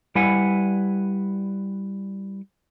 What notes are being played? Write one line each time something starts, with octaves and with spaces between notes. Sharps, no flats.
G3 E4 B4 F#5 G#5